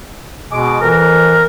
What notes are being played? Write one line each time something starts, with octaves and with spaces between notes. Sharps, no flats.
B2 G#3 D6
F2 E3 A#4